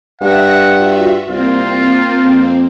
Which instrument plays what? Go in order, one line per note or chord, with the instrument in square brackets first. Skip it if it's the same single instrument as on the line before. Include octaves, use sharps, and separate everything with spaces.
[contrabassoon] G2 [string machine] E5 A#6 [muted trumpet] F#5
[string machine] F4 F#4 E5
[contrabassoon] C2 [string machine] A#3 C4 [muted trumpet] F4
[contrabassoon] F2